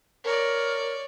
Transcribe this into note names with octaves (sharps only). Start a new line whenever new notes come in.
A#4 C#5 D5